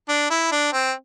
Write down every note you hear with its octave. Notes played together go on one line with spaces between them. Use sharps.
D4
E4
D4
C4